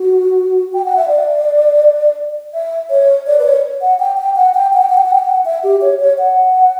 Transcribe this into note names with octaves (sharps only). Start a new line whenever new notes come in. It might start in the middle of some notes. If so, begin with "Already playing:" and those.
Already playing: F#4
G5
F#5
E5
D5
E5
C#5
D5
B4
C#5
F#5
G5
G5
F#5
G5
F#5
G5
F#5
G5
F#5
G5
F#5
E5
G4
C#5
C#5
F#5